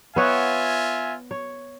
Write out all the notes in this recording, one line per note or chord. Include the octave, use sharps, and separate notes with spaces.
B3 F4 C#5 E5 F#5 G#5
C#5